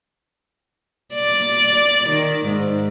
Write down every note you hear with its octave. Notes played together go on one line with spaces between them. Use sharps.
D5
D#3
G#2